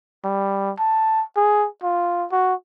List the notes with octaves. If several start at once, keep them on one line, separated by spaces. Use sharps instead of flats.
G3
A5
G#4
F4
F#4